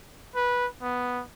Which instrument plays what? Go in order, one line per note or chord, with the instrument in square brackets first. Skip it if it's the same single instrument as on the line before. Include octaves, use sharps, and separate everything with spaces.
[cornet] B4
B3